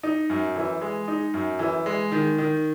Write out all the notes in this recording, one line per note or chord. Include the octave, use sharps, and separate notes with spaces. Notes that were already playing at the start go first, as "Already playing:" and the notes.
D#4
F#2
E3
G#3
D#4
F#2
E3
G#3
D#3
D#3